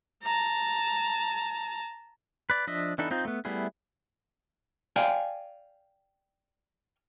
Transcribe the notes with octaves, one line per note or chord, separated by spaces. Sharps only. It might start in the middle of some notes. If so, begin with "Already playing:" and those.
A5 A#5
B4 D5
F3 D4 D#5 E5
E3 B3 D4 D#4 A4
C4 D#4 F4 G6
A3 B3
G3 A3 B3 E4 G#4
D5 F5 G5 G#5